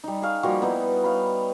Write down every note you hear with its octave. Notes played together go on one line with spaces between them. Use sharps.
G3 D#4
G#4 F5 C#6
F3 G3 A#3 F#4
B3 D#4 E4
C#5 F5 B5